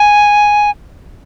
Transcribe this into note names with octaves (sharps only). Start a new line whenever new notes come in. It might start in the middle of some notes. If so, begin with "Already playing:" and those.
Already playing: G#5